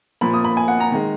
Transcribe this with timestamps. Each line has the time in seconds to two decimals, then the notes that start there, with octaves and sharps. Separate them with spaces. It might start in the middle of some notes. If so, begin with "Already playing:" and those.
0.21 A#2 F3 A#3 B5
0.34 D#6
0.44 B5
0.57 G#5
0.68 F#5
0.80 A#5
0.92 D#3 G#3